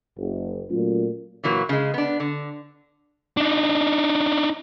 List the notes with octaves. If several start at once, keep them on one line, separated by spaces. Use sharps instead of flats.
F#1
A#2 F#3 A3 C#4 F4
A#2 E3 F#3 A#3
C#3 G#3
B3 D4
D3
D4 D#4